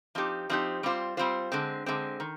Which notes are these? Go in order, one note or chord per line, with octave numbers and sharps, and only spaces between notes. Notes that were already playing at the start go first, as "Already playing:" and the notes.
F3 C4 D#4 G4
F3 C4 D#4 G4
G3 C4 F4 C5
G3 C4 F4 C5
D3 G#3 C4
D3 G#3 C4
D#3